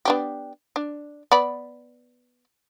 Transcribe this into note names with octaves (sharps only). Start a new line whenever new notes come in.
B3 D4 G4
D4
B3 D5 B5